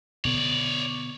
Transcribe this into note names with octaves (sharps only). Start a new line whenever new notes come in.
B2 D3 B3 C#5 D5